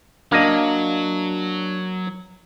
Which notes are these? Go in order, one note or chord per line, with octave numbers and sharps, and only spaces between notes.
F#3 A#3 D4 D5 D#5 F5